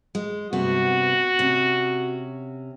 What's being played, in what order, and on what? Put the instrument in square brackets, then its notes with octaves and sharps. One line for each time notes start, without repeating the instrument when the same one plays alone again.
[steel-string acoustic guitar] G#3
[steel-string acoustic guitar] G2 C3 B3 [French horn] F#4
[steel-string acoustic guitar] C3 C#4